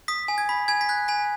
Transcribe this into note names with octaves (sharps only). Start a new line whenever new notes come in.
D#6 B6
G#5
G#6
B5 B6
G#5 G#6
B6
F#6 G#6
G#5 B6